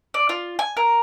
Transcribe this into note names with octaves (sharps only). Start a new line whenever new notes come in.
D5
F4
G#5
A#4